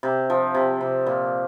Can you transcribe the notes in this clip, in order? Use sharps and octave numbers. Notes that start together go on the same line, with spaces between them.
C3
F3
C3
C3
A#2